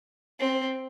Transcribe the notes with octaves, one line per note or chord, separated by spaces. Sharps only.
C4